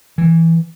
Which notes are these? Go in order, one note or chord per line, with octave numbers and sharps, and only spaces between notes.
E3